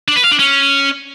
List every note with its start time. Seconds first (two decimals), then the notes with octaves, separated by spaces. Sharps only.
0.08 D4
0.16 B4
0.24 F5
0.32 D4
0.39 C#4